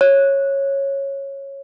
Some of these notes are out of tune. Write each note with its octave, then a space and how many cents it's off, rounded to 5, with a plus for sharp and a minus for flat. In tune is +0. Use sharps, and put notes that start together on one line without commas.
C#5 -10